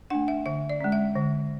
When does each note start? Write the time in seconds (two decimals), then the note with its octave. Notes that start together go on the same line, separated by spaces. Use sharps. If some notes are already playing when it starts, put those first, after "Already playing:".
0.10 A3 D4 F#5
0.28 E5
0.46 D3 E5
0.70 D5
0.81 G#3 C#4
0.92 E5
1.16 D3